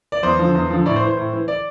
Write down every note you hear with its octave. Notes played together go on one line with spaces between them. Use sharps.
D5
E2 C5
D3 F3
E2
D3 F3
A2 D5
C5
E3
C5
A2
E3
D5